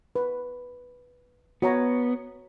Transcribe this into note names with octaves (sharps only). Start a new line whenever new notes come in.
B4
B3 F#4 C#5 A#5